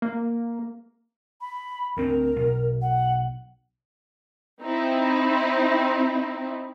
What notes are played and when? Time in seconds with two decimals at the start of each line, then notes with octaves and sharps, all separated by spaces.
0.02 A#3
1.41 B5
1.97 D2 C4 A#4
2.36 B1
2.81 F#5
4.61 C4 D#4 E4